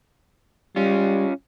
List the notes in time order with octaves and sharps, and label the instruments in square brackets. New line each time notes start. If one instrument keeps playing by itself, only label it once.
[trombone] G3 [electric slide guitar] C#4 F4